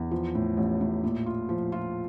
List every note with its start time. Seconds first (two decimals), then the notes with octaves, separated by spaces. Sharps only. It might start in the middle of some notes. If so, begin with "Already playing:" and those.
Already playing: E2
0.11 F3
0.35 A2
0.57 A1
0.81 A2
1.04 A#2
1.26 F4
1.49 F3
1.72 F4